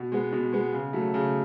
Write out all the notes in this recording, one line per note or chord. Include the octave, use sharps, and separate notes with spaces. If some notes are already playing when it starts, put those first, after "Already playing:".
Already playing: B2
G#3 B3
B2
G#3 B3
C#3
F#3 A3
C#3